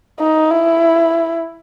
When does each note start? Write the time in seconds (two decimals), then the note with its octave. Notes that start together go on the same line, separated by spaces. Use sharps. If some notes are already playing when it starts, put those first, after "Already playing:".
0.20 D#4
0.50 E4